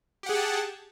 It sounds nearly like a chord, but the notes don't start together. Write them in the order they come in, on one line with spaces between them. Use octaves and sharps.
G4 F#5 G#4 G5 A5